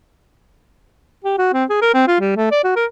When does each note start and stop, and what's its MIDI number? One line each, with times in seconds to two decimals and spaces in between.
1.24 1.35 67
1.38 1.51 66
1.53 1.64 60
1.70 1.77 68
1.82 1.91 70
1.94 2.05 60
2.08 2.19 65
2.20 2.34 55
2.36 2.49 57
2.51 2.61 74
2.64 2.72 66
2.76 2.85 70